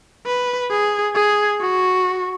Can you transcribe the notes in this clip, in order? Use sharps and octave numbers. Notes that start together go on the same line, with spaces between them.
B4
G#4
G#4
F#4